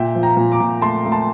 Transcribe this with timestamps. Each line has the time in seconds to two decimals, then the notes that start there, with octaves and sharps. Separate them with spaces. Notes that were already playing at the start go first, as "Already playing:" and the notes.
Already playing: A#2 E5 G5
0.15 F3
0.23 G5 A#5
0.37 A#2
0.52 A#5 D6
0.60 A#2
0.82 A3 A5 C6
1.05 A3
1.12 A5 C6